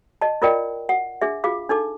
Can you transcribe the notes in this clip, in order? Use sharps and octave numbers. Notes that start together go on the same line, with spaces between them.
D#5 A5
E4 F4 A#4 D5 D#5 G5
F#5
D4 G#4 E5
F4 G#4 F5 D6
D4 D#4 A4 D6